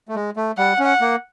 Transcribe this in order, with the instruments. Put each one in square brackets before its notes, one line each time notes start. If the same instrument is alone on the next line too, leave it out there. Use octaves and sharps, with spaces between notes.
[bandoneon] A3
G#3
A3
[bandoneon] G3 [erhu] F#5
[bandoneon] C#4
[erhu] F#5
[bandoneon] A#3